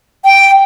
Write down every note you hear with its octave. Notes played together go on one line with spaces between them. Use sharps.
G5